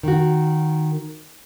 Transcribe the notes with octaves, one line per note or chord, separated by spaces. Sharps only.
D#3 F#4